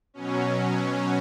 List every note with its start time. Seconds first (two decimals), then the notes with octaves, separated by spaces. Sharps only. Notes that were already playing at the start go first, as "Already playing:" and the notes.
0.14 B2 F#3 C#4
0.80 C#4